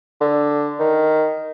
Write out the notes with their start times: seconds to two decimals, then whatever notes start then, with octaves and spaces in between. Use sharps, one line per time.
0.21 D3
0.79 D#3